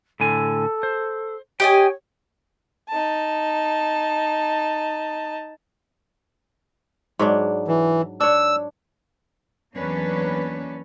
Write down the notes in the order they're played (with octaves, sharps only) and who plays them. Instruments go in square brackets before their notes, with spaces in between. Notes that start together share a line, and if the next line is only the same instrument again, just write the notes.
[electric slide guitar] A2 D3 G#5 [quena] A4
[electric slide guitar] C5
[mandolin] G4 D#5 G#5 [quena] C#5 [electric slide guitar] G5
[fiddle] D#4 A5
[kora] G#2 F#3 D4
[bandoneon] E3
[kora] D4 C#5 [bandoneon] E6
[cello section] E2 F#3 A#3 C#4 D4 B4